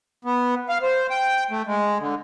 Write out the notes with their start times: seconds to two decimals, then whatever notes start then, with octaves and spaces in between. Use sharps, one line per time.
0.25 B3
0.69 F5
0.82 C5
1.10 G5
1.51 A3
1.67 G#3
2.00 D3